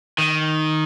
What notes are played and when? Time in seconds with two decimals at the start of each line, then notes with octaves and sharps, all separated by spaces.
0.18 D#3